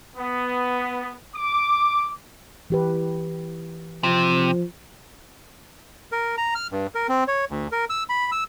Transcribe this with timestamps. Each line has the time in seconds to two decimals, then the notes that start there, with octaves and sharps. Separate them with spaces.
0.17 B3
1.34 D6
2.70 E3 G4 B4
4.03 C3 F3
6.12 A#4
6.38 A#5
6.55 F6
6.72 G2
6.95 A#4
7.09 C4
7.28 C#5
7.51 D2
7.72 A#4
7.90 E6
8.09 B5
8.32 E6